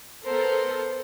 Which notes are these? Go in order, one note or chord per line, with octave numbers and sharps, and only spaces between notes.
B3 A4 A#4 C5